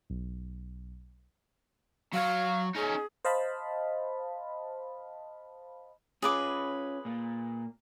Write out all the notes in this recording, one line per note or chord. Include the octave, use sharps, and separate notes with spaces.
B1
F#3 C#5 F5
C#4 D#4 G#4
C5 D#5 F5 A5 B5
C#4 F4 G#4 B4 D6
A#2 A#3